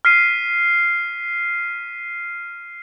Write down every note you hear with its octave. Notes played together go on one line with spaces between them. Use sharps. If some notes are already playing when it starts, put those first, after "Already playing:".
F6 B6 C7 D#7